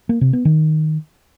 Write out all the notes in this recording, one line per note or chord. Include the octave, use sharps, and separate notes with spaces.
A#3
C3
B3
D#3